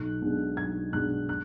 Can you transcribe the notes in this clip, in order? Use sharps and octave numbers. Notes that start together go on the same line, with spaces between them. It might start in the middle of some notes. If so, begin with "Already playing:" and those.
Already playing: B1 F#6
B2 G#3 D4
B1 G#6
B2 G#3 D4 F#6
F#6